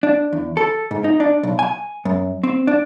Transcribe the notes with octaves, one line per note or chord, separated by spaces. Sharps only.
D4
E2
A4
G#2
D#4
D4
B1
G#5
F#2
C4
D4